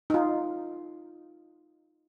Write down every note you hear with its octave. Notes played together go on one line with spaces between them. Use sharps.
D#4 F4